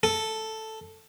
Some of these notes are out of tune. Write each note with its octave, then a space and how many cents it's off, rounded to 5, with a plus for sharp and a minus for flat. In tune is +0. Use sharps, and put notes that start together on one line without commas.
A4 +0